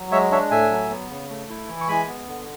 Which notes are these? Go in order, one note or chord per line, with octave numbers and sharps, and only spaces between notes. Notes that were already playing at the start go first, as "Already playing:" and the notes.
Already playing: F#3
G#3 C#5 E5
D4 C#5 E5
A2 E5 G#5
F#3
B3
C#3
A3
E4
E3
C#6
G#3 G#5 B5
B3
D3